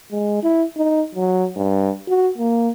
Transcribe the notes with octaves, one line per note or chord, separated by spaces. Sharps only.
G#3
E4
D#4
F#3
G2
F#4
A#3